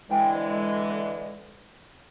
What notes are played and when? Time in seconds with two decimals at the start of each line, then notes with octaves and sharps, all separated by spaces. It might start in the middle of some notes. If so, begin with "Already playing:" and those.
0.10 D3 E3 G#3 E5 G5 G#5
0.34 C5 F#5
0.90 B4